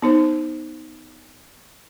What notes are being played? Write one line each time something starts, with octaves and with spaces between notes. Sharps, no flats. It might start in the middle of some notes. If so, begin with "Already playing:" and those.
B3 D#4 C5